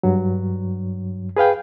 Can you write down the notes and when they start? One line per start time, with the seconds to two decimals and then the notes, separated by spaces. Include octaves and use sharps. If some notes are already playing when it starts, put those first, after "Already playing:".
0.03 G2 F#3
1.37 G#4 B4 F5 G5